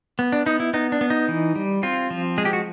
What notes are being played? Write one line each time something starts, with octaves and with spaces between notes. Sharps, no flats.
B3
D4
B3 D#4
E4
B3 D#4
D4
B3
D#4
E3
G3
C4 F4
F3
G#3 G#4
G4
F#4